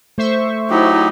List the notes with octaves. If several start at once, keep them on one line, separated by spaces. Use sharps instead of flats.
A3 C5 E5 C#6
F#3 D#4 E4 G4